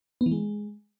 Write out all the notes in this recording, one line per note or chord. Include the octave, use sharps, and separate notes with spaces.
B3
E3
G#3